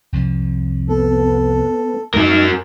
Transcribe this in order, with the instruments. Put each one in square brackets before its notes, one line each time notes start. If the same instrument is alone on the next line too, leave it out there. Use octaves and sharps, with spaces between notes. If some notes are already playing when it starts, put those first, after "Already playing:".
[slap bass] C2 F2 F3
[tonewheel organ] B3 [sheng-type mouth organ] A4
[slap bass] F#2 G3 A3 [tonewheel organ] D#4 E5 [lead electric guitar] F#4 A#4